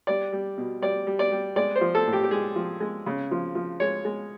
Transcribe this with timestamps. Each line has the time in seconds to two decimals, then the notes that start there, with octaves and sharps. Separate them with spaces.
0.07 G3 D5
0.32 G3
0.58 B2
0.82 G3 D5
1.07 G3
1.19 D5
1.32 G3
1.56 G#3 D5
1.76 C5
1.81 F3
1.95 A4
2.07 A2
2.13 G4
2.23 G4
2.31 G#3 G#4
2.56 F3
2.80 G#3
3.06 C#3
3.31 F3
3.55 F3
3.80 G#3 C#5
4.05 G#3